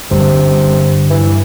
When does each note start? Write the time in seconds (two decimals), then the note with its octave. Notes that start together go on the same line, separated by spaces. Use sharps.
0.11 G1 G2 C3
1.10 E3